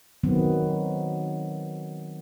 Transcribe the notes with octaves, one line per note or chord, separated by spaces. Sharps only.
D#3 F#3 B3 C4